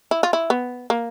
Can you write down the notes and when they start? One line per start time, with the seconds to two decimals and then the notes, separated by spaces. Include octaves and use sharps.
0.11 E4
0.23 F4
0.33 E4
0.50 B3
0.90 A#3